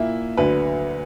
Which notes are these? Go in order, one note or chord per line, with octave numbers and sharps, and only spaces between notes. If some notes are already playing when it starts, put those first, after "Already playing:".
Already playing: A#2 A#3 E4 E5
D2 D3 F#3 B4